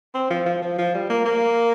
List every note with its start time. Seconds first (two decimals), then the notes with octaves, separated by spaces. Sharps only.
0.14 C4
0.30 F3
0.46 F3
0.62 F3
0.78 F3
0.95 G3
1.10 A#3
1.25 A#3